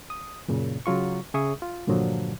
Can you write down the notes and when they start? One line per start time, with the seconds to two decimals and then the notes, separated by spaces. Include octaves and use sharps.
0.10 D#6
0.48 F#2 A#2 C#3
0.86 C#3 F#3 F4 C#6
1.34 C#3 G#4 E5 C#6 D#6
1.62 F4
1.87 G2 A#2 D3 F3 F#3